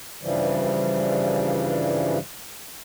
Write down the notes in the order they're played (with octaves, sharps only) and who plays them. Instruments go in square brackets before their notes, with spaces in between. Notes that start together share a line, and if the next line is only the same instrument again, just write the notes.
[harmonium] G2 C#3 E3 F3 G3